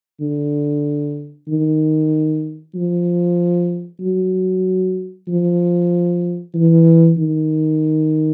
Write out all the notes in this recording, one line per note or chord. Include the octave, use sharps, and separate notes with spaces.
D3
D#3
F3
F#3
F3
E3
D#3